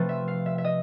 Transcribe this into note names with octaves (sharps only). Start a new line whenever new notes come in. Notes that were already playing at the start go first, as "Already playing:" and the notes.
Already playing: C3 F3 A3 C4 B4
E5
F5
E5
E5
D#5